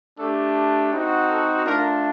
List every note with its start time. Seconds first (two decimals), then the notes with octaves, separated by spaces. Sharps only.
0.18 A3 D4 G4 A4
0.92 C4 D#4 F#4
1.29 A4
1.65 A3 D4 F4 A#4